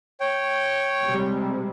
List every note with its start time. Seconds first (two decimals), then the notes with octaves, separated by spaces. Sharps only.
0.20 C#5 G5
1.05 C3 G3 G#3